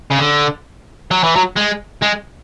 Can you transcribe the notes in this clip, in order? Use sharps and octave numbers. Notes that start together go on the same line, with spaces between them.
C#3
D3
F#3
E3
F#3
G#3
G#3